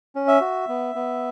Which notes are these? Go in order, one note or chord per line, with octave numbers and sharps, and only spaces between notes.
C#4
E5
F#4
B3
B3